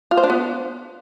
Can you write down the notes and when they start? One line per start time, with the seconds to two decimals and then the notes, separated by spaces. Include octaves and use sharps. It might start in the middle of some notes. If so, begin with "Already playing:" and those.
0.11 F4
0.17 C5
0.24 D4
0.30 B3